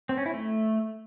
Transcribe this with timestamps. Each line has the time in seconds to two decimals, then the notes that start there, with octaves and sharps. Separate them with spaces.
0.09 C4
0.18 C#4
0.26 E4
0.34 A3